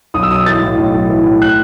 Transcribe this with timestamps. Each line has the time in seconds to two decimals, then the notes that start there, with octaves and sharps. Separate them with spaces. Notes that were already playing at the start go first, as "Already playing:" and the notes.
0.14 B1 D#6
0.23 E6
0.30 B1 D#6
0.46 E3 A6
0.62 A2
0.78 B1
0.94 B1
1.10 E3
1.26 A2
1.42 F#6